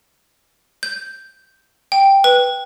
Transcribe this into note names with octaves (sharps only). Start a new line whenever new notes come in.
G6
G5
B4